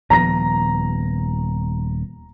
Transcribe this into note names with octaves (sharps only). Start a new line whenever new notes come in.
D#1 F3 B3 A#5 A#6